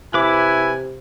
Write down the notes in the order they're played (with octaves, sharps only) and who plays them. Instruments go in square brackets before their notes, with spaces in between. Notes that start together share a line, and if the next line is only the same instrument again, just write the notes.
[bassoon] C3 [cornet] E4 [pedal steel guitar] B4 D6 [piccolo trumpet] G#5